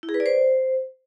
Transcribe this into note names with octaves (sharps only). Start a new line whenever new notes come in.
E4
G#4
B4
D5
C5